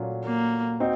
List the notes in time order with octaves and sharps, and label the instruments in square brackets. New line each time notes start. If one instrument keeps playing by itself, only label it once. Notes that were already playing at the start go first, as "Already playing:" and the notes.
Already playing: [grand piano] A#2 F#3 A3 C#4 F4
[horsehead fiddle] A#3
[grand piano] C4 D#4 F#4